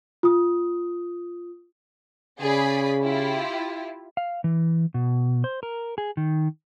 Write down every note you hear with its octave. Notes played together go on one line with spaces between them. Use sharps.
F4 D#6
C#3 G#4 D5 B5
E4 F4 G4
F5
E3
B2
C5
A#4
G#4
D#3